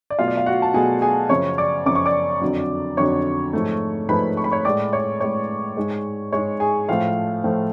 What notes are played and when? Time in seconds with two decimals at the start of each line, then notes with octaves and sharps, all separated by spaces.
0.10 D5
0.19 B2 F#3 A3 F4 F5
0.28 D5
0.37 F5
0.46 F#4 F#5
0.62 A5
0.74 B2 F#3 A3 G#4 G#5
1.01 G#4 G#5
1.29 F#2 C#3 F3 C#5 C#6
1.58 D5 D6
1.86 F#2 C#3 F3 D6
1.95 C#6
2.06 D5 D6
2.41 F2 D3 F#3
2.97 F2 D3 F#3 C#5 C#6
3.53 G#2 F3 A3
4.09 G#2 F3 A3 B4 B5
4.37 C#6
4.44 B5
4.51 C#5 C#6
4.65 A2 G#3 D5 D6
4.93 C#5 C#6
5.20 A2 G#3 C#5 C#6
5.77 G#2 G#3
6.32 G#2 G#3 C#5 C#6
6.60 G#4 G#5
6.88 A2 F3 A3 F4 F5
7.44 A2 F3 A3